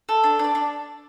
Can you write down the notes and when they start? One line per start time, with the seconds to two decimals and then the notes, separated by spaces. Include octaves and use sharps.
0.09 A4
0.24 D4
0.39 D4 D5
0.55 D4